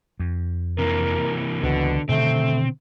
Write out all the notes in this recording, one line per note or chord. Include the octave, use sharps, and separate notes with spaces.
F2
C3 E3 A#3 A#4
C#2 B2 D3 E3
B2 D3 D#3 A3 C4